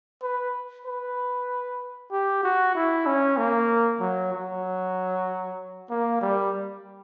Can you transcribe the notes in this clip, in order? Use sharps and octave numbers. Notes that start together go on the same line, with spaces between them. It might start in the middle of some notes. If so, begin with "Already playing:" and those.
B4
B4
G4
F#4
E4
C#4
A#3
F#3
F#3
A#3
G3